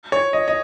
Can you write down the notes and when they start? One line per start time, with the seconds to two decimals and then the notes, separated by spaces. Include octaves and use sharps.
0.12 C#5
0.33 D#5
0.48 D#5